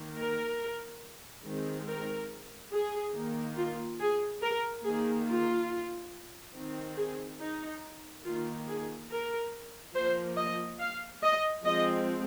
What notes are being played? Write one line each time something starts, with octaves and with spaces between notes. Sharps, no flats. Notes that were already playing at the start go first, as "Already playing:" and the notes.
Already playing: D#3 A#3
A#4
D#3 G#3 C4
A#4
G#4
D#3 A#3
F4
G#4
A#4
D#3 A#3 G#4
F4
D#3 C4
G#4
D#4
D#3 A#3 F4
G#4
A#4
F3 A#3 C5
D#5
F5
D#5
F3 G#3 C4 D#5